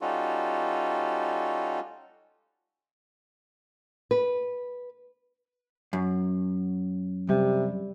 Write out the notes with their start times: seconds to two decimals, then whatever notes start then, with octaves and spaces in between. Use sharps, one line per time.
0.01 G3 C#4 D#4 F4 F#4 A4
4.11 B4
5.93 F#2
7.29 C3 G3